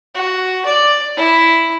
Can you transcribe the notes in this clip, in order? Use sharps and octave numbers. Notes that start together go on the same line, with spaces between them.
F#4
D5
E4